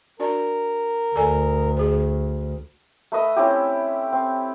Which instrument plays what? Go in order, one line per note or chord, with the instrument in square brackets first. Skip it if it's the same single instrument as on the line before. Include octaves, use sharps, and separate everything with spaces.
[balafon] D4 F#4 D5 [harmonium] A#4
[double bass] D2 [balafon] A4 D5 G#5
[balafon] G#4 C5
[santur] A3 B4 D#5 E5
C4 C#4 E4 G4
C4